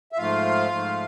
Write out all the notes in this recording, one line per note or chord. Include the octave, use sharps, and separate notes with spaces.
E5
G#2 F3 A3 F4 F5
G#2 F3 A3